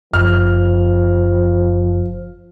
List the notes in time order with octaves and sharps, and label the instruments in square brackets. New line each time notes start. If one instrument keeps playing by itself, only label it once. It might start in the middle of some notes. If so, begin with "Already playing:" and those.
[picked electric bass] F#1 [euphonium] F3 [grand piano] F6